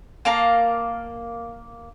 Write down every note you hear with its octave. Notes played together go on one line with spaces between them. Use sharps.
A#3 F5 A5 A#5